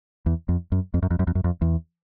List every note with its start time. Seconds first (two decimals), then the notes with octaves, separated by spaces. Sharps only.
0.26 E2
0.49 F2
0.72 F#2
0.94 F2
1.02 F#2
1.11 F2
1.19 F#2
1.27 F2
1.35 F#2
1.44 F2
1.61 E2